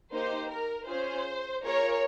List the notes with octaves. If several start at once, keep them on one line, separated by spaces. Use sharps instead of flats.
A#3 D#4 G4 C5
A#4
C#4 F4 G#4 C5
A#3 F4 G#4 A#4 C#5